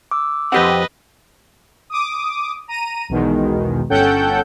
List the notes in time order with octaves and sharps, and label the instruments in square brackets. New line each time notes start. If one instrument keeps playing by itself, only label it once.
[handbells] D6 E6
[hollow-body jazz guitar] F2 G4 F#5 [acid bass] C4 [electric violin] B4 D#5
[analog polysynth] D6 D#6
A#5 D#7
B1 E2 B2 D#3 G#3
G1 C#4 A4 F#5 G5 G6